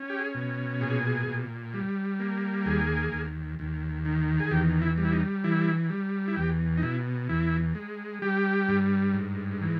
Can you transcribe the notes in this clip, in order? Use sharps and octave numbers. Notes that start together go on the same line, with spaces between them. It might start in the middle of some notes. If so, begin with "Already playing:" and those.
Already playing: C#4
G4
G#4
B2
A#2 G#4
A#2
G3
A#3
D#2 G#4
D#2
D#2
D#3
G#4
E2 G4
E4
G3
E4
D#4
E3 E4
G3
E4
E2 G4
D#4
B2 E4
E2 E4
G#3
G3 G4
G2
G#2
E3